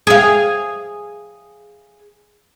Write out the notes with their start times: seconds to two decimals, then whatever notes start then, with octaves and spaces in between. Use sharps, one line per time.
0.07 G#4 F5